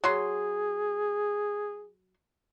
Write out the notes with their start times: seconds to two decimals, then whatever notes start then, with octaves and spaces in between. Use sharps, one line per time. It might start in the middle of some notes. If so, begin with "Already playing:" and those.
0.04 F#3 G#4 C6